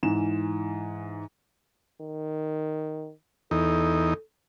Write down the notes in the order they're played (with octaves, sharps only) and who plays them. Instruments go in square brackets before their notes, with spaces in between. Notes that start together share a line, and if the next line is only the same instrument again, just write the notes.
[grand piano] G#2 E3 E7
[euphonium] D#3
[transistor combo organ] E2 D#4 [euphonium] A4